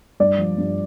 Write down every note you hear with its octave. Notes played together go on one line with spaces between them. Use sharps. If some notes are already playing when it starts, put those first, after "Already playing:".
G2 D5
F3
G2